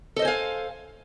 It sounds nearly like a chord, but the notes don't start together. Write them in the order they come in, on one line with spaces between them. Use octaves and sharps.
A4 D#5 C5 G#5 F5